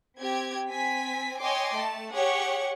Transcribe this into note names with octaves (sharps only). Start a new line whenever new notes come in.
C4 G4 G#6
C4 G#5 B6
C#5 D#5 G5 G#5 C6 D6
A3 A5
G4 G#4 C#5 F#5 C#6